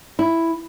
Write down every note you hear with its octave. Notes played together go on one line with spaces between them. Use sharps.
E4